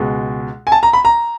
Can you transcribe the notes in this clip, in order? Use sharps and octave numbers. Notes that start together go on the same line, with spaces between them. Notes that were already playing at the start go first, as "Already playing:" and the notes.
Already playing: C#2 B2 G#3
G#5
A5
A#5
B5
A#5